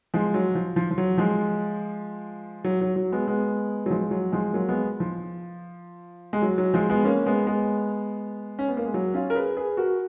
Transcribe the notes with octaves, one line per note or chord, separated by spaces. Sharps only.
F3 G#3
F#3
F3
F3
F3
F#3
F3 G#3
F#3
F#3
F#3
G#3 B3
G#3 B3
F#3
F3 G#3
F#3
F3 G#3
F#3 A#3
G#3 B3
F3
G#3
F#3
F#3
F3 G#3
G#3 B3
A#3 C#4
G#3 B3
G#3 B3
C#4
B3
A#3
G#3
F#3
C#4 F4
A#4
G#4 B4
G#4 B4
F#4 A#4